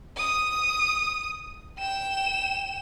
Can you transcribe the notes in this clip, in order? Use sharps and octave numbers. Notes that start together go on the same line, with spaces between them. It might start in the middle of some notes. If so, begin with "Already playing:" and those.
D#6
G5 E7